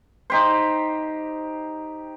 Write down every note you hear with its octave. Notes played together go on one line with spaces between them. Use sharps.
D#4 G4 C5